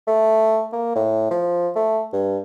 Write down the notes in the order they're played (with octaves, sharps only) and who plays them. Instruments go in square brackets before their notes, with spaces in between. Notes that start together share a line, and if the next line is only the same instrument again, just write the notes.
[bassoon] A3
A#3
A2
F3
A3
G2